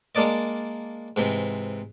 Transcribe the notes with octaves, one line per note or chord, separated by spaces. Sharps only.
G#3 A#3 D4 D5 D#5
G#2 C3 E3